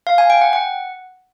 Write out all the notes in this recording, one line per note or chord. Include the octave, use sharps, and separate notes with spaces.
F5
G#5
G5
F#5
F#5